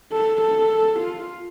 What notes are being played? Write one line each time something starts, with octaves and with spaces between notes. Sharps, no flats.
A4
A4
F4